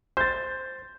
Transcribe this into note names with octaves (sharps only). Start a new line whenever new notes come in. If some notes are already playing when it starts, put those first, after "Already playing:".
C5 G6 A6